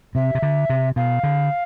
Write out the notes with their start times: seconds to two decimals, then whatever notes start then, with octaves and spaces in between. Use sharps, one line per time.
0.15 C3 E5
0.35 C3
0.42 D3
0.70 C3
0.96 B2 F5
1.23 D3